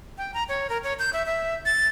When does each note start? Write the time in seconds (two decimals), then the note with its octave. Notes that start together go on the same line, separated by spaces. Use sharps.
0.18 G5
0.34 A#5
0.49 C#5
0.69 A#4
0.83 C#5
0.99 G6
1.13 E5
1.26 E5
1.66 A6